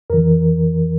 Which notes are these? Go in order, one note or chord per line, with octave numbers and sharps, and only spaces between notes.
F2 E3 A#4